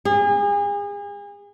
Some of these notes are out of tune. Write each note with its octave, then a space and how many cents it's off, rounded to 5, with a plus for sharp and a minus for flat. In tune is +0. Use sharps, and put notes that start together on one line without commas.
G#4 -35